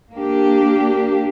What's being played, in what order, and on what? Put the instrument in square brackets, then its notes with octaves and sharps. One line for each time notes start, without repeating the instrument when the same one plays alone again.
[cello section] A#3 D4 G4